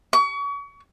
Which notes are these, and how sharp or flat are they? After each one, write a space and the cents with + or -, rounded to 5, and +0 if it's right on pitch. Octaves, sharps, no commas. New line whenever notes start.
C#6 +35